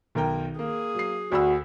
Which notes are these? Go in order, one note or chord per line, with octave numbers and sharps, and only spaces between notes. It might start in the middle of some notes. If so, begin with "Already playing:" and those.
B1 D#3 A#4 G5
A#3 G#4
F#3 C7
D2 F#4 D5 B5 E6